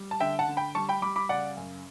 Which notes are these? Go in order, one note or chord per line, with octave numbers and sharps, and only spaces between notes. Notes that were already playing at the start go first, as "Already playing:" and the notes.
Already playing: G3
A5
D3 E5 G5
F#5 A5
D3
G5 B5
G3 A5 C#6
G5 B5
G3 B5 D6
B5 D6
C#3 D5 F#5
F#2